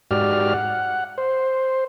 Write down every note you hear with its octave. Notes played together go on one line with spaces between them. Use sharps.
G#2 F#4 G4 D5 F6
F#5
C5